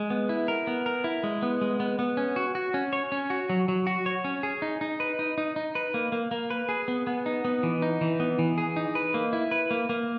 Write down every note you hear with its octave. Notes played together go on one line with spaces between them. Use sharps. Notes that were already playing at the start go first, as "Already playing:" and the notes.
Already playing: G#3
B3
E4
A#4
B3
A#4
E4
G#3
B3
G#3
B3
B3
C#4
F#4
F#4
C#4
C#5
C#4
F#4
F#3
F#3
F#4
C#5
C#4
G#4
D#4
D#4
B4
D#4
D#4
D#4
B4
A#3
A#3
A#3
B4
G#4
B3
B3
D#4
B3
E3
D#4
E3
B3
E3
G#4
D#4
B4
A#3
E4
B4
A#3
A#3